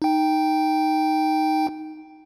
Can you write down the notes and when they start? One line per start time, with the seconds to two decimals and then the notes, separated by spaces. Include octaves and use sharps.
0.02 D#4 G5